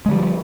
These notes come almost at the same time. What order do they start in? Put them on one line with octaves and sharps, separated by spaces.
G#3 D3 G3 F3